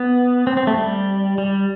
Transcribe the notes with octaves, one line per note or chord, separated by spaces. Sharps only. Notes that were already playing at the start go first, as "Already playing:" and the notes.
Already playing: B3
C4
C4
A3
G3
G3